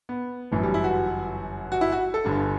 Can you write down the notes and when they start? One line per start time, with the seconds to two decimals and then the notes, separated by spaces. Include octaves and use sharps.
0.09 B3
0.52 G1 F#2 E3
0.63 G3
0.74 E4
0.84 F#4
1.72 F#4
1.81 E4
1.92 F#4
2.14 A4
2.25 G1 G2 D3